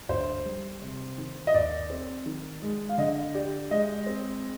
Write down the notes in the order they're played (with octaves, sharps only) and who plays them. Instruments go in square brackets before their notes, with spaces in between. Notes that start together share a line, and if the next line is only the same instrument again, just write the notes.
[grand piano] D2 [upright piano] C5
[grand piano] G3
C3
D#3
[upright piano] D#5
[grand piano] D#2 [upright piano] D5
[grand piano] C4
D#3
G#3
[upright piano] F5
[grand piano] D3 [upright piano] D#5
[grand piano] G4 [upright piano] D5
[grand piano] G#3 [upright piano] D#5
[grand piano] C4